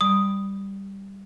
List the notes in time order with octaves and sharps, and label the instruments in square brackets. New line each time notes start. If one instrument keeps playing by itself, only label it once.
[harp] G3 D7 [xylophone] D#6